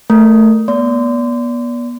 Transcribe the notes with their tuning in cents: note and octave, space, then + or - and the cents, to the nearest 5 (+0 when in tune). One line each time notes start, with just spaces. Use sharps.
A3 +0 A#4 -5
B3 -35 D5 -30 C6 -30